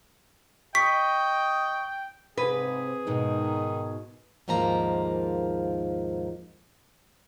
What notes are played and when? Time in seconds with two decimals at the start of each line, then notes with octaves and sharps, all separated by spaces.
0.75 D#5 G5 C#6 B6
2.37 G#2 C3 G#4 B4
3.07 G#2 B2 D#3 D#4
4.48 D#2 G#2 F3 A#3 A#5